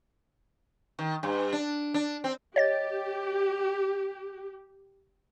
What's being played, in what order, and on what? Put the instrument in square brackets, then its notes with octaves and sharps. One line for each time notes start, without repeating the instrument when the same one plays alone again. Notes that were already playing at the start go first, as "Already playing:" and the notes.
[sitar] D#3
G2
D4
D4
C4
[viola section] G4 [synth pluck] C#5 D#5 A6